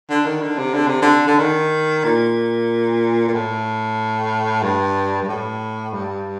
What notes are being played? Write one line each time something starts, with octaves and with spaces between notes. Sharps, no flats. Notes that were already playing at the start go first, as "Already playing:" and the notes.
D3
D#3
D3
C3
D3
C3
D3
D3
D#3
A#2
A#2
A2
G2
G2
A2
G2